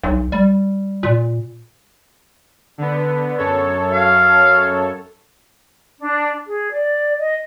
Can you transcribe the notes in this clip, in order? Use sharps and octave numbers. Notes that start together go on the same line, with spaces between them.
B1
G3
A#2
D3 B3
F#2 A4 C#5
F5
D4
G#4
D5
D#5